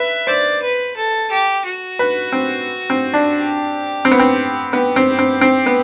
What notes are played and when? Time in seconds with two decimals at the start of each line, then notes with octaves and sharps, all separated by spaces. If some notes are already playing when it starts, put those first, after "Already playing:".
Already playing: B4 E5
0.27 C5 D5
0.62 B4
0.96 A4
1.31 G4
1.65 F#4
1.99 B4
2.32 C4
2.90 C4
3.14 D4
3.35 G4
4.05 C4
4.11 B3
4.19 C4
4.72 B3 G4
4.96 C4
5.19 C4
5.41 C4
5.66 B3